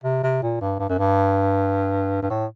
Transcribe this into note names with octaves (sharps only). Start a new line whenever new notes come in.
C3
C3
A#2
G2
G2
F#2
G2
G2
A2